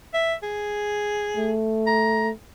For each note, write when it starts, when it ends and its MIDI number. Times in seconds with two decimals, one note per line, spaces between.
0.14 0.34 76
0.43 1.52 68
1.37 2.30 57
1.87 2.28 82